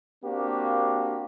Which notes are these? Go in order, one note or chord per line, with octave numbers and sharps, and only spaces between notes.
A#3 C4 D4 F#4 G4